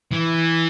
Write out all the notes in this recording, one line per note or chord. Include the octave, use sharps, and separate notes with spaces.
E3